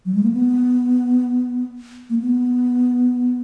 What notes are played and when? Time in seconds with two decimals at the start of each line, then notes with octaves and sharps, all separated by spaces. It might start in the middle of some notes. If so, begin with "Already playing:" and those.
0.06 F#3
0.15 G#3
0.23 A#3
0.32 B3
2.10 A#3
2.20 B3